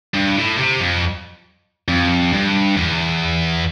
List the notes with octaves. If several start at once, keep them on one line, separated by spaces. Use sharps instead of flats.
G2
A2
C3
F2
F2
G2
E2